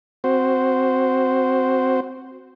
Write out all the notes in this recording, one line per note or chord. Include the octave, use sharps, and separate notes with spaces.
C4 F#4 C5